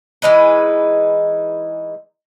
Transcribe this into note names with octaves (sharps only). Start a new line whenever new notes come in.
E3 G#3 D#4 B4